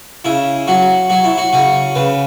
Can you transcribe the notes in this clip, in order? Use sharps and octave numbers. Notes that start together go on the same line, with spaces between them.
C#3 E4
F#3 F#4
F#3 F#4
E4
F#4
C#3 F#4
C#3 B4